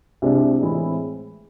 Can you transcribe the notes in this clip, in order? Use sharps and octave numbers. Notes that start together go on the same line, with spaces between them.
C2 C3 G#3 D4
A2 E3 G#3 C4 E4